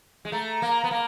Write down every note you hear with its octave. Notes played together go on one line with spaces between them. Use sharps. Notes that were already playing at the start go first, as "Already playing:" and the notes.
G#3
A3 A#5
A#3
B3
A#3 A#5